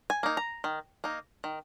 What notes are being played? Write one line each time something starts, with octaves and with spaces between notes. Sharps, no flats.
G#5
A#3 D#4
A#5
D#3
A#3 D#4
D#3